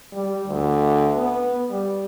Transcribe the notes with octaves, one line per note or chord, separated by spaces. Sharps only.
G3
D2
B3
G3